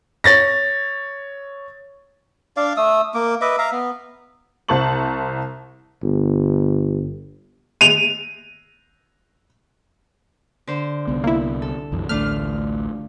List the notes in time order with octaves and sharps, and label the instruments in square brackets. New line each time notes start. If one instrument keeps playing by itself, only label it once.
[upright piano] C#5 A6 A#6
[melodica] D4 D5 F5
A3 D#6 E6
A#3 D6
B4 D#5 E5 D6
E5 F5 A#5
B3
[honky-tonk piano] C2 C5 A5 C#6 F#7
[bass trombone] G1
[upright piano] D#7 F7
[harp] D3 C5
[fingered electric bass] C2 B3
[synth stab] A#3 E4
[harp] A4
[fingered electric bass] C2 F#2 E3
[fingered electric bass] A1 D2 [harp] A3 D4 F4 [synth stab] F6